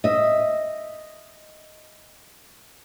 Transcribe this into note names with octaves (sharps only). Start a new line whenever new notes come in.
D#5 E5